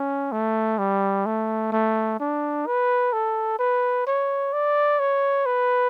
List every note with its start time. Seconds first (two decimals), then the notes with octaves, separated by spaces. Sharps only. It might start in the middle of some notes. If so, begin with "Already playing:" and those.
Already playing: C#4
0.32 A3
0.79 G3
1.26 A3
1.72 A3
2.20 D4
2.67 B4
3.13 A4
3.59 B4
4.07 C#5
4.53 D5
5.00 C#5
5.46 B4